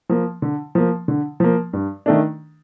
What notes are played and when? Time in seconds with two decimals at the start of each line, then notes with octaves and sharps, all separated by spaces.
0.09 F3 A#3
0.42 D3
0.75 F3 A#3
1.08 D3
1.40 F3 A#3
1.73 G2
2.06 D#3 A3 D4